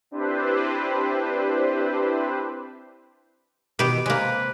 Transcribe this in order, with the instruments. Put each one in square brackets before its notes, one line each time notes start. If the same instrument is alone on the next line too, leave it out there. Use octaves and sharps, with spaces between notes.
[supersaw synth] C4 D4 E4 G4 B4 C5
[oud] B2 D#3 E3 [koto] G4 B4 [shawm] D6
[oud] C3 [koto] G#3 A#3 [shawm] B4